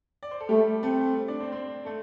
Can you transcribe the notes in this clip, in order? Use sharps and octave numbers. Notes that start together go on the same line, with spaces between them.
D5
C5
A4
G3 A3 G4
A3 C4 A4
D4 D5
C4 C5
C4 C5
A3 A4